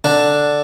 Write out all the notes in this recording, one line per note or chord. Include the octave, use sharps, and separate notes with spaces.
D3 D4